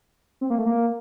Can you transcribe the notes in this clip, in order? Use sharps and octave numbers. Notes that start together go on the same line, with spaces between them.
C4
A#3
A3
A#3